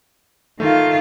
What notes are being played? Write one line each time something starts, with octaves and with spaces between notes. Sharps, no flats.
D#3 A3 F4